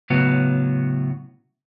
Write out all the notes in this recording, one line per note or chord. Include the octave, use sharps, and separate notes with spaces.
A2 C#3 F#3 B3